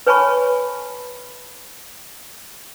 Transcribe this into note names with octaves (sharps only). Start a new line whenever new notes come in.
B4 C#5 G#5 A5 B5 C#6